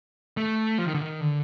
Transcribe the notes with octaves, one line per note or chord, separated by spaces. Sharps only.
A3
F3
D#3
D3
D#3
D3